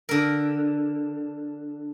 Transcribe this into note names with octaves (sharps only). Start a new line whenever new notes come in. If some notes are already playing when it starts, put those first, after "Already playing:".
D3 A#4